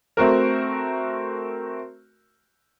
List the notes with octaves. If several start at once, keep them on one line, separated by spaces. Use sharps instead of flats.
A3 C4 F#4 A#4